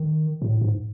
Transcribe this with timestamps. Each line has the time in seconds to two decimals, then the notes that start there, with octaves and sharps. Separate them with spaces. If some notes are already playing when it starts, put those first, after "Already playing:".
Already playing: D#3
0.42 A2
0.61 G#2